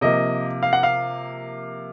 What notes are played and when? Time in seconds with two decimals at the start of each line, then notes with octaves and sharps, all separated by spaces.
0.01 C3 F3 A#3 D#5
0.63 F5
0.73 F#5
0.83 F5